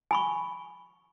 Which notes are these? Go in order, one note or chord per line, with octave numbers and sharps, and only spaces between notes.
G#5 B5 C#6